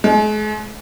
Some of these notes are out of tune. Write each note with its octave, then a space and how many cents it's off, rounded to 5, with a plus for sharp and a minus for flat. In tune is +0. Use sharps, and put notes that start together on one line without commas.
G#3 +40